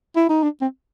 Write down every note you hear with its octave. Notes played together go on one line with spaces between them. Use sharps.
E4
D#4
D4
C4